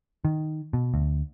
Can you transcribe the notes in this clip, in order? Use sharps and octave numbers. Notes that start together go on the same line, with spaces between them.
D#3
B2
D2